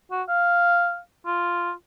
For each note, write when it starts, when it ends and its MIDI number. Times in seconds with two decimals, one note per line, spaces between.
0.11 0.22 66
0.28 0.99 77
1.26 1.72 65